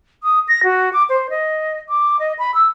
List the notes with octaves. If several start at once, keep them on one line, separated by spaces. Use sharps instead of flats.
D#6
A#6
F#4
D6
C5
D#5
D6
D#5
B5
E6